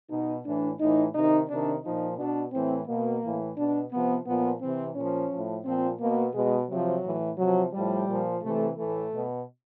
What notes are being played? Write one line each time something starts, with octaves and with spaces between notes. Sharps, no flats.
B2 D#4
A2 E3 D4
A2 E3 D#4
C3 D#3 D#4
C3 D#3 D4
A#2 F3 D#4
B2 D4
A2 E3 C4
B2 A#3
A2 E3
B2 D4
C3 F3 B3
A#2 F3 B3
C3 E3 C4
A#2 F3 C#4
A2 F3
A#2 F3 C4
B2 A#3
B2 G#3
C3 F3 F#3
A2 E3
C3 F3 F#3
A2 F3 G3
A#2 F3
C3 E3 A3
A2 E3 A3
B2